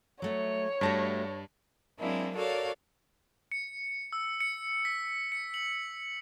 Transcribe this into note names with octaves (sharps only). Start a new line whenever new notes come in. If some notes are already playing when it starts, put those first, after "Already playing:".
F#3 A3 C#5 E5
G2 G3 A3 F#4 A5 A#6
F#3 G#3 A#3 C4 D4 E4
F#4 A4 A#4 C#5 D5 F5
C#7
E6
C#7
B6
C#7
F#7